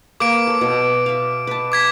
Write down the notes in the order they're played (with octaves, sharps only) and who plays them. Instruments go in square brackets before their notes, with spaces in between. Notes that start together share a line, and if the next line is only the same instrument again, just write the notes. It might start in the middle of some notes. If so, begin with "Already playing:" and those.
[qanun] A#3 B4 G#5 [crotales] D6 D7
[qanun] A4 C#5
B2
E5 F5
B4 A5
[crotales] D6 G#6 B6